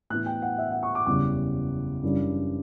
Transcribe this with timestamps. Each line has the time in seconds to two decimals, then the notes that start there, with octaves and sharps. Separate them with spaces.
0.10 A2 E3 B3 E4 F#6
0.26 G5
0.42 F#5
0.58 E5
0.71 F#5
0.83 C#6
0.95 D6
1.06 F#1 E2 C#3 G3 D6
2.03 F#2 C#3 E3 G3 D4